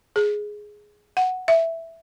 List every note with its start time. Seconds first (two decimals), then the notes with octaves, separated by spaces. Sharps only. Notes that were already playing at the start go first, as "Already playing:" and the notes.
0.16 G#4
1.17 F#5
1.48 E5